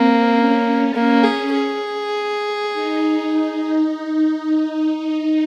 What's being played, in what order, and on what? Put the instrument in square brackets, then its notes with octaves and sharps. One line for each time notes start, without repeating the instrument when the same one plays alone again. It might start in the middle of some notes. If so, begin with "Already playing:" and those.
Already playing: [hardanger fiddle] A#3 [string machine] C4
[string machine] C#4
[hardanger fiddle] A#3
G#4
G#4
[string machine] D#4